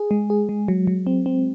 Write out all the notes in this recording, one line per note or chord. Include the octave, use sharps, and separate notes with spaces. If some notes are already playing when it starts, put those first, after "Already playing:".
Already playing: G#4
G#3
G#4
G#3
F#3
F#3
C4
C4